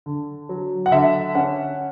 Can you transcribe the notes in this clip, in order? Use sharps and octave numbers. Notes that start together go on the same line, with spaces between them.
D3
F#3
F#5
D3 E5
C#4 F#5